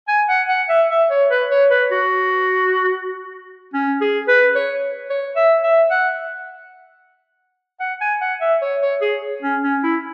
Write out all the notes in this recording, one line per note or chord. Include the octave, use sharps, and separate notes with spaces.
G#5
F#5
F#5
E5
E5
C#5
B4
C#5
B4
F#4
C#4
G#4
B4
C#5
C#5
E5
E5
F#5
F#5
G#5
F#5
E5
C#5
C#5
G#4
C#4
C#4
E4